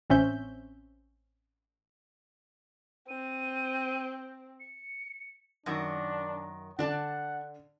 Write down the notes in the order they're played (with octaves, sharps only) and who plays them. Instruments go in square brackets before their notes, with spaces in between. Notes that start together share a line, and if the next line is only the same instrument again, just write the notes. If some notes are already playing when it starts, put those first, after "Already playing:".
[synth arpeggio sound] A1 C4 C#4 E5 G6
[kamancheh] C4 [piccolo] D#7
[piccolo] C#7
[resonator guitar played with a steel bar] F#2 D#3 F#4 [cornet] D4
[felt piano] D3 [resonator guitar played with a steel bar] D4 D5 A5 [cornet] F#5